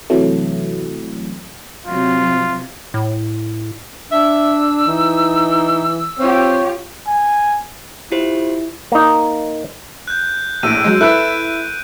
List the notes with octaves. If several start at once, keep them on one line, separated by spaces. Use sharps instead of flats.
C3 E3 F#3 A3
C3 F#3 F4
A2
D4 E5 E6
E3 D#4
C4 F4 G4 C#5
G#5
E4 F4 G4 C5
A#3 D#4
F#6 G6
A#1 A2 E6 D7 D#7
F#3 G#3 G6
E4 A4 B4 E5 F#6 D7